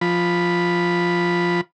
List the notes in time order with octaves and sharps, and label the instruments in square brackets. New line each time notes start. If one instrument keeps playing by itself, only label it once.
[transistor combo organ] F3 B5